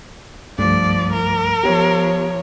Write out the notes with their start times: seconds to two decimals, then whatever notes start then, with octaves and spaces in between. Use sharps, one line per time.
0.58 C2 G2 F3 A3 D5
1.13 A#4
1.64 F3 B3 G4 C#5